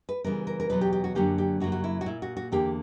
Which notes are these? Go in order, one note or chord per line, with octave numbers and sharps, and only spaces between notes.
B4
C#3 E3 G3 B3 A#4
A#4
A#4
E2 B2 F#3 B3 B4
G4
G4
F#4
F#2 D3 F#3 A#3 G4
G4
F#2 C#3 F#3 A#3 F#4
F#4
E4
F#4
A#2 A#3 E4
F#4
F#4
E2 D3 A#3 G4